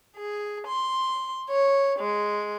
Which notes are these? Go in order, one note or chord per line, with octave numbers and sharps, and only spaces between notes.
G#4
C6
C#5
G#3